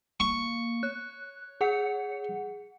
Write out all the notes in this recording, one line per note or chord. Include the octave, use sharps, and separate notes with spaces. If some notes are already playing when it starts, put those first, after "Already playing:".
A#3 C#6
C#5 F#6
G#4 F#5 C#7